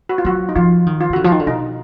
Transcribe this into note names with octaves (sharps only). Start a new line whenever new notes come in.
F#4
F4
F#3 F#4
D#4
F3 F4
D#3
F4
D#3
D3 F#4
F3 F4
D#3
D3
B2 D#4